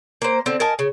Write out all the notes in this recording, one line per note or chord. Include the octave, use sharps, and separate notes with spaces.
A#3 C5
D3 C4
A#4 D#5 G#5 A5
C#3